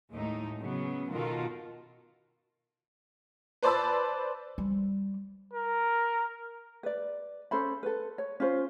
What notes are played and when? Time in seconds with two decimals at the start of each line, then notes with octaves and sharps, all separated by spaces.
0.11 D#2 A2 G#3 A3 D#4
0.58 C#3 F#3 B3
1.11 B2 D#3 F4 F#4 A4 A#4
3.63 B4 C5 D5 A5 B5 E6
4.58 G3
5.53 A#4
6.83 B4 D5
7.51 C#4 A4 C5 B5
7.83 A4 B4
8.18 C#5
8.40 C#4 F4 C5